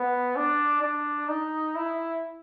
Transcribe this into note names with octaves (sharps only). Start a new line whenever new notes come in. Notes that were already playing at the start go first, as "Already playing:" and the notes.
Already playing: B3
D4
D4
D#4
E4